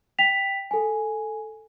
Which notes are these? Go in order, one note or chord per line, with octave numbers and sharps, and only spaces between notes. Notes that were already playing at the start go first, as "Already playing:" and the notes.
G5 B6 F7
A4 G#5